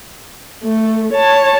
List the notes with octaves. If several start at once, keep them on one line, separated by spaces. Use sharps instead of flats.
A3
C#5 A5